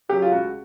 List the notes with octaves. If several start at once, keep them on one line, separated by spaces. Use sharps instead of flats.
C#3 F#3 G4
F4
C#2 F#4